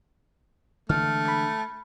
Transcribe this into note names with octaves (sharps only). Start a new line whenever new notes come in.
D3 E3 G#3 A3 F6
B5 G#6